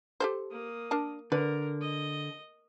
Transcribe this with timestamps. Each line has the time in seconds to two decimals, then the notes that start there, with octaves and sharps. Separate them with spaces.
0.20 G4 A4 C5
0.51 A#3 D#6
0.91 D4 A#4 A5
1.32 D3 A#4 B4
1.82 D#5